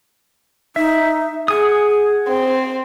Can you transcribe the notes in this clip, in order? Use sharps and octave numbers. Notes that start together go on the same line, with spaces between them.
D#4 E5
G#4 F#5 G#5 D#6
C4